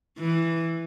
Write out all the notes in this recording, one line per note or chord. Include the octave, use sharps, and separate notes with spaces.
E3